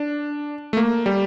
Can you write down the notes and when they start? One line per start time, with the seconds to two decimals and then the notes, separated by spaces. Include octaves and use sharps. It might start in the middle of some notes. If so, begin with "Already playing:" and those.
Already playing: D4
0.73 A3
0.77 A#3
1.06 G3